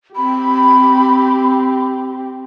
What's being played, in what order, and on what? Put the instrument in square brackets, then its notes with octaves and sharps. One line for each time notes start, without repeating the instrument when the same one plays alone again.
[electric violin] C4 G4 [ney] B5